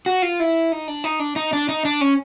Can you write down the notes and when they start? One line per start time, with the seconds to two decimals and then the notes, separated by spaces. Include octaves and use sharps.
0.06 F#4
0.22 F4
0.40 E4
0.72 D#4
0.88 D4
1.04 D#4
1.20 D4
1.36 D#4
1.53 D4
1.69 D#4
1.85 D4
2.01 C#4